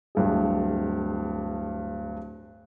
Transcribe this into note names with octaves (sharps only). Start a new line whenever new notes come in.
D1 G2 G#4